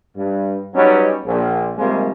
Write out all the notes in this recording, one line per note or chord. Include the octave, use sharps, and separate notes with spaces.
G2
F#3 G3 B3 C#4 D#4
A#1
C3 D#3 F3 G3 G#3 A#3